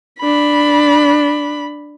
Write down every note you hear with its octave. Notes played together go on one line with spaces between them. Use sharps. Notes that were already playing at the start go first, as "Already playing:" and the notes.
D4 B5